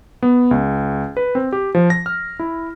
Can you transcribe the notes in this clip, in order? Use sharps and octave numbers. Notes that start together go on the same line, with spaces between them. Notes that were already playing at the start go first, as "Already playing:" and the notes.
B3
C#2
B4
C4
G4
F3
A#6
F6
E4